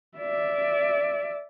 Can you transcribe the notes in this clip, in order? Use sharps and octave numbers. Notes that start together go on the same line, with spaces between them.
D5 E5